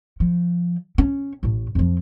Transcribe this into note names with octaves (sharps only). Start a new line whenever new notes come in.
F3
C#4
A1 A2
F2 F3